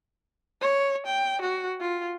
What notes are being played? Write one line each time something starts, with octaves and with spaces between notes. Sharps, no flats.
C#5
G5
F#4
F4